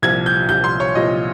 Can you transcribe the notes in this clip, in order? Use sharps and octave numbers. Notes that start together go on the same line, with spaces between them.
C2 A#2 F3 G#6
G6
C2 A#2 F3 G6
C6
C#5
C2 A#2 F3 D#5